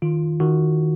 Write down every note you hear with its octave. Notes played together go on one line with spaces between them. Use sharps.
D#3 F4
D#3 F#4